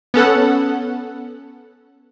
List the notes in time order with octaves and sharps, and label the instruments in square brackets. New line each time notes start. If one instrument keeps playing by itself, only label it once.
[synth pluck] B3 C#4 A4 F#5